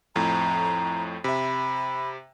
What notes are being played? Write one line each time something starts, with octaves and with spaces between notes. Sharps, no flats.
F2 A2 A#5
C3 E5 B5